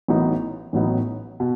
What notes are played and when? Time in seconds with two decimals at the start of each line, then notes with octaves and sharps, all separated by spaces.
0.08 A1 A2 F#3 B3 D#4
0.73 A1 A2 F#3 B3 D#4
1.40 B2